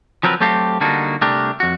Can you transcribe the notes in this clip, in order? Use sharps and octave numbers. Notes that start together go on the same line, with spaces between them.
F3 F#3 C4 A#4 B4
F#3 A3 C4 G4 A4 F5
D3 G3 A#3 D4 D#4 F#4
C2 A3 D4 G4 A#4
F2 F#4